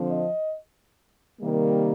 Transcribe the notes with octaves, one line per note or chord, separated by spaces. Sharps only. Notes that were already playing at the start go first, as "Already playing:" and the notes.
Already playing: D3 F3 C4
D#5
C3 D#3 G3 A#3